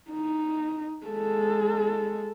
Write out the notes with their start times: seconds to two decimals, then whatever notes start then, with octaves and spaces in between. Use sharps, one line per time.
0.11 D#4
1.07 G#3 A4